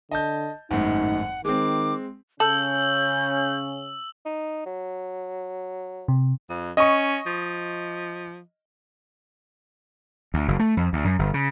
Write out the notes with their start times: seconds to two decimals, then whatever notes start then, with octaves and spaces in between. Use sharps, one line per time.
0.11 D3 D#5 A5 G6
0.71 G#1 F#2 A2 D#4 F#5
1.45 D#3 G#3 C4 D6
2.40 C#3 C#4 A4 E6 G6 F#7
4.25 D#4
4.66 F#3
6.08 C3
6.49 F2
6.77 C#4 D#5 C#6
7.26 F3
10.34 D2
10.48 F#1
10.59 A3
10.77 F2
10.93 D2
11.05 F#2
11.19 G1
11.34 C#3